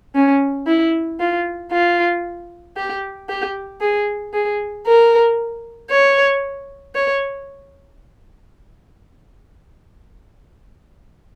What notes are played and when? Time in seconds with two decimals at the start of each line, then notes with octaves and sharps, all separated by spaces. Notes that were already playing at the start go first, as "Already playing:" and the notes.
0.15 C#4
0.67 E4
1.19 F4
1.72 F4
2.77 G4
3.29 G4
3.81 G#4
4.33 G#4
4.86 A#4
5.91 C#5
6.95 C#5